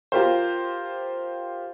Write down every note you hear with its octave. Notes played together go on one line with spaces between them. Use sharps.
F4 G4 A#4 C5